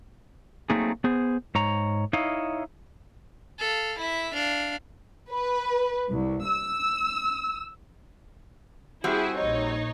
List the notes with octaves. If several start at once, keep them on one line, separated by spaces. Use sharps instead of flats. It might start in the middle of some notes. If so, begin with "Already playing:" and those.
F#3 A3 A#3 C4 D#4 G#4
B3 G#4 C5
G#2 C#5 A#5
D#4 E4 C#5 D#5 F5
A4 F5
E4 E5
D4 F5
B4
C2
E6
G3 C4 E4 F#4 G#4
A#1 D#4 C#5